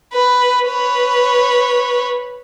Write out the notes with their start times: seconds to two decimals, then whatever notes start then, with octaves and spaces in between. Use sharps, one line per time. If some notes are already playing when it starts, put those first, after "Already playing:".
0.13 B4
0.68 B4 C#5